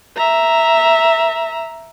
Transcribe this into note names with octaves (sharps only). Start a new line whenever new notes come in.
E5 A#5